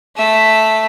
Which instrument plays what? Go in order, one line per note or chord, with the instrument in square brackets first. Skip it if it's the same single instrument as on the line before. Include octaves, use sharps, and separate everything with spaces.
[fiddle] A3 E5